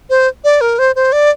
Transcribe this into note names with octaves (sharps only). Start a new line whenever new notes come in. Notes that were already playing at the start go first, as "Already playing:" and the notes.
C5
D5
A#4
C5
C5
D5